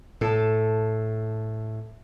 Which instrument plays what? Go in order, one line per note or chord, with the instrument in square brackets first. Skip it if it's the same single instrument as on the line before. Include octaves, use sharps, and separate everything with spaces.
[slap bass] A2 [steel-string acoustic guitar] A4 A5